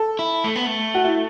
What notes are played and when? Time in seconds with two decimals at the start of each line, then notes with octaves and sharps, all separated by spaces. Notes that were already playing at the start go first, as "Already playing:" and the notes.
Already playing: A4
0.19 E4
0.44 A3
0.55 B3
0.66 A3
0.94 F#4
1.04 E4